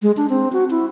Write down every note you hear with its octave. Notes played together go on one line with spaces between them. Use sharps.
G#3
D4
C4
F#4
E4